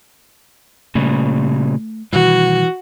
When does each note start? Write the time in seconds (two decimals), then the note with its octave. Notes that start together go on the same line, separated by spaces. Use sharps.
0.95 A#2 C#3 G3 A3
2.13 B2 D#3 E3 G3 F#4